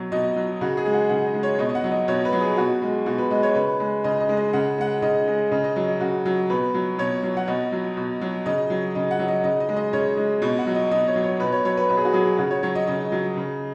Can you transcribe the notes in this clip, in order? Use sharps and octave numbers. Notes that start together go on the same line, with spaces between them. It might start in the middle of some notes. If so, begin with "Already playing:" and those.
Already playing: B2 F#3
B2 D#5
F#3
C#3 F#4
G#4
G#3
F#5
C#3 F#5
D#5
G#3
C#5
B2 D#5
D#5
F#5
F#3
D#5
B2 C#5
B4
F#3
G#4
B2 F#4
G#3
B2 F#4
B4
G#3 D#5
C#5
C#3 B4
G#3
C#3 D#5
D#5
G#3
D#5
C#3 F#5
G#3 F#5
C#3 D#5
G#3
C#3 D#5
D#5
F#3 D#5
C#3 F#4
F#3
B2 B4
F#3
B2 C#5
F#3
F#5
B2 D#5
F#3
B2
F#3
C#3 D#5
F#3
C#3 D#5
F#5
F#3
D#5
C#3 D#5
D#5
G#3
D#5
C#3 C#5
G#3
B2 D#5
F#5
F#3
D#5
B2 D#5
C#5
F#3
C#5
B2 B4
C#5
F#3 C#5
B4
B2 B4
G#4
F#4
F#3 G#4
C#3 F#4
C#5
F#3 C#5
D#5
C#3 D#5
F#3
C#3